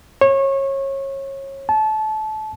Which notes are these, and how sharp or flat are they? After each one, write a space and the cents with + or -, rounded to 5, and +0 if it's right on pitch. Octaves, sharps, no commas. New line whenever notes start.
C#5 -25
A5 -25